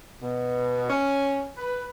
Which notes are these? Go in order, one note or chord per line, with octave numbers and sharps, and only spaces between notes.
B2
C#4
B4